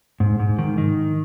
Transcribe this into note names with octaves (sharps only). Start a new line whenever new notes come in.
G#2
G#2
D#3
D#3